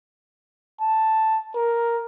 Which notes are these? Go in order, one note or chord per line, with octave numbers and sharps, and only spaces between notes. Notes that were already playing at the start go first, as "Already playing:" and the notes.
A5
A#4